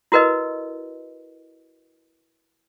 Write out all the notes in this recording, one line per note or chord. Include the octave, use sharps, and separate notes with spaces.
E4 F#4 A#4 B4 D#5